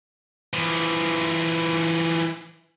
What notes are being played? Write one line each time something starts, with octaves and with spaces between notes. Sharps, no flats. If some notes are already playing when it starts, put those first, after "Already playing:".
E3 F3